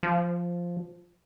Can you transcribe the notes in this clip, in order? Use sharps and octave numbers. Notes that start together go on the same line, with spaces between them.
F3